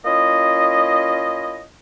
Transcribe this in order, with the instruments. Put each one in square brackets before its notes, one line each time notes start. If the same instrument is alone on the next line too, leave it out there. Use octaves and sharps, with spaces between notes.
[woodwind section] A#3 C#4 E4 F4 D#5